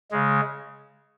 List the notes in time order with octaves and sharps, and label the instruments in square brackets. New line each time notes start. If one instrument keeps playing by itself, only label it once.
[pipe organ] C#3 G#3